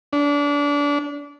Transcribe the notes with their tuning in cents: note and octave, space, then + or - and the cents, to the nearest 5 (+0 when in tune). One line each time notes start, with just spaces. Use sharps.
D4 -30